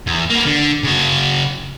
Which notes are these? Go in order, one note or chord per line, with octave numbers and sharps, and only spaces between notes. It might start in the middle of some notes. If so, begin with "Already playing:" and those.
E2
A#3 B3
D3
C#3 F#4